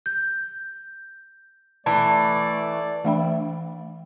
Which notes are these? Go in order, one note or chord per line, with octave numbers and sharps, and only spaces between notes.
G6
E3 A3 D5 A5
E3 A3 D4 E5 G5 B5